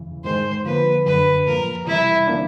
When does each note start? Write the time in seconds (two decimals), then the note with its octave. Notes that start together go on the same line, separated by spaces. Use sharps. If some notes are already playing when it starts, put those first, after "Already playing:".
Already playing: E2 C#3 E3
0.24 G#2 D#3 G#3 C5
0.65 D3 F3 A#3 B4
1.06 F#2 D3 F#3 B4
1.47 A2 F3 A#3 A#4
1.87 C3 E3 G3 E4
2.27 C#3 F3 A#3 D4